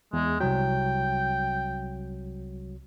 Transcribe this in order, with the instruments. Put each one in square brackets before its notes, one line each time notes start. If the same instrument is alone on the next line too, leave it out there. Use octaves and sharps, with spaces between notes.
[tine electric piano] E2 [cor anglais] G#3
[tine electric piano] C2 F#3 [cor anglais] G5